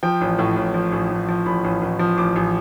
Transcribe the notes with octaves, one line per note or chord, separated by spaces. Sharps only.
F3 G5
A1
A2
A1
F3
A1
A1
F3
A1 B5
A1
A1
F3
A1 D6
A1